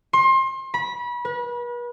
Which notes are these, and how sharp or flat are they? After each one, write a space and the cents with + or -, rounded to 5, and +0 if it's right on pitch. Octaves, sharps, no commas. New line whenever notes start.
C6 +30
B5 -30
B4 -40